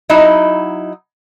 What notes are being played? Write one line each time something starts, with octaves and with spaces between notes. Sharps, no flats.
F#3 D#4 E4 D#5